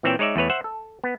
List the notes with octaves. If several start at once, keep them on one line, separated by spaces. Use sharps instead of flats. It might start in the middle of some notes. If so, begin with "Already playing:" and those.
A#2 E3 C4 C#5 E5 G5
G#3 D#4 C#5 D5 E5
E2 A3 B4 C#5
C5 E5 F#5
A4
B3